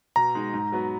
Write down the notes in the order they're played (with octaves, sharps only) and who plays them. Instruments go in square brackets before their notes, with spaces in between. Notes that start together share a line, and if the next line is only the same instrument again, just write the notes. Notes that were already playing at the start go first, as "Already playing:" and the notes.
[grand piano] B2 [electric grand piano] A#5
[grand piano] G#3 D#4
G#2
F#3 B3 F#4 B4